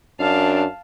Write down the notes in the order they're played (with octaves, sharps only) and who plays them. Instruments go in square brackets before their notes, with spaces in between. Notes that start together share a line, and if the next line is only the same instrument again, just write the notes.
[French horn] F#2 [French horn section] D4 [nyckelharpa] F5 A5